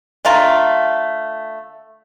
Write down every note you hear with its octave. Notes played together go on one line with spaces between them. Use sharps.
D3 A3 F4 A#5